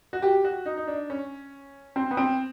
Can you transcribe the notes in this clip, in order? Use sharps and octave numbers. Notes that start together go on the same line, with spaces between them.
F#4
G4
F#4
D#4
D#4
D4
C#4
C4
B3
C4